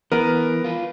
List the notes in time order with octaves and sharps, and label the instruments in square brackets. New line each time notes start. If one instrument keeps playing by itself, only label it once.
[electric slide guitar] E3 [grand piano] B3 A#4
[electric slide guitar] F4 B4